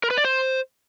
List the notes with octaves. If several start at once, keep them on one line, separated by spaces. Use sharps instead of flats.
A#4
B4
D5
C5